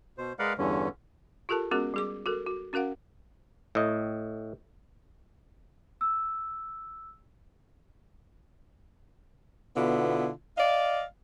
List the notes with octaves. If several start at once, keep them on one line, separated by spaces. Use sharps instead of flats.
B2 C5
G#3 A#4 B4 D5 F5 F#5
E2 G2 D3 E3 C#4
F4 G4 A4 A#4 A5
G#3 B3 C#4 F#4 G#4 A#4
G3 G#4 D6
F#4 A4 A#4
F#4
C#4 F#4 A#4 F5 F#5
A2 D#5
E6
B2 D3 B3 E4 F4
D5 D#5 F5